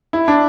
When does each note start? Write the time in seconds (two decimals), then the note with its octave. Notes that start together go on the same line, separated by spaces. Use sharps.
0.13 E4
0.28 D4